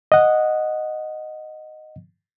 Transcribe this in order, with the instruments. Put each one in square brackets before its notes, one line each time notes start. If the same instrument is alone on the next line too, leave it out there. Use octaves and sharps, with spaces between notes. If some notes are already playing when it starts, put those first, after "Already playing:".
[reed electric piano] D#5 F#5